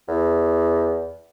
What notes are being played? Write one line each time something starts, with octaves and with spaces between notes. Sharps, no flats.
E2